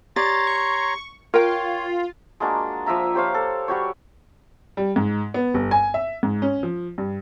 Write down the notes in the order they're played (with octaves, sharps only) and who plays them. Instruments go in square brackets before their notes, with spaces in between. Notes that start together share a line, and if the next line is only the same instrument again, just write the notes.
[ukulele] G4 D5 [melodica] C#5 A#5 C6 [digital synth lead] A6
[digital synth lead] C#6
[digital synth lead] F4 [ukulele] A#4 G5 [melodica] C#5
[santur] G#3 A#3 D4 F#4
F3 A#3 E5 A#5
G4 C5 C#5 F5
A4
G3 F#4 G4 C#5
[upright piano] G3
G#2
B3
G1
G#5
E5
G#2
C#4
F3
G2